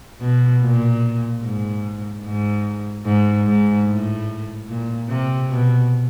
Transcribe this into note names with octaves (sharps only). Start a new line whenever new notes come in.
B2
A#2
G#2
G#2
G#2
G#2
A2
A#2
C3
B2